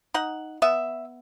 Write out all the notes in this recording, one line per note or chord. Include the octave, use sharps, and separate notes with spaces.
D#4 F#5
B3 E5